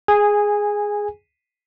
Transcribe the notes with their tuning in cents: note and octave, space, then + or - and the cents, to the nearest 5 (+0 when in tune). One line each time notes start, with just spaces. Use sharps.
G#4 +0 G#5 -15